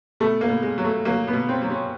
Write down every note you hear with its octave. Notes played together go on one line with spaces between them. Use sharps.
B2 A3
A#3
B2
G#3
F#3
A3
F#3 A#3
B3
B2
C4
F#3
C#4